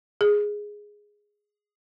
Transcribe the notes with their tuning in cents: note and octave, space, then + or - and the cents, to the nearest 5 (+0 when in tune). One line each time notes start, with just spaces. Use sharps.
G#4 +0